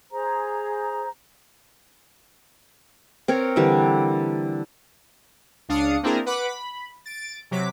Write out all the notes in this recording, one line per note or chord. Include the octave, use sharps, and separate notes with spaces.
G#4 C5 A#5
C4 A#4 C#5
D3 E3 G3
C#2 D4 F5 D#6 C#7
A#3 C4 D4 E4 G#4 A#4
B4 F#5 B5 D6
B5
A6 D7
C3 F#3 D6 B6